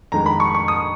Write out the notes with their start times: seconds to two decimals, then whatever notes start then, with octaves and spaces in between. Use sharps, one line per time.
0.12 F2 D#3 G#3 A#5
0.26 B5
0.40 C#6
0.55 C#6
0.68 D#6